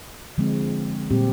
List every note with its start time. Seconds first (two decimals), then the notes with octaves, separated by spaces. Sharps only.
0.38 D3 F3 G#3 C4
1.10 A#2 G3 C4 G4